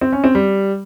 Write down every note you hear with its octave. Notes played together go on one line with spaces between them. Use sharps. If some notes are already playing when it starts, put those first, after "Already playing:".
C4
C#4
C4
G3